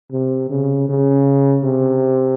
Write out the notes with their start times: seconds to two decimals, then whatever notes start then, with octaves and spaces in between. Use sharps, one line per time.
0.12 C3
0.50 C#3
0.89 C#3
1.64 C3